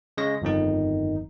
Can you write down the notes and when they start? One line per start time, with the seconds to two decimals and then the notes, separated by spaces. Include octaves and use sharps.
0.17 C#3 G#3 D#5 A#6
0.42 G1 F2 D#3 D#4